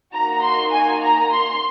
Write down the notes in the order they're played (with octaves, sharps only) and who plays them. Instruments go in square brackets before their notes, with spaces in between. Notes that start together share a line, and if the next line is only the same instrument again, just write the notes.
[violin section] A#3 D#4 F#4 A#5
C6
G#5
A#5
C6